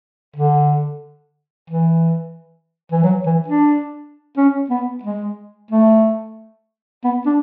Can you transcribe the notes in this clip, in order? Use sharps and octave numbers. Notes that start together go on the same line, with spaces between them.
D3
E3
E3
F#3
E3
D4
C#4
B3
G#3
A3
B3
D4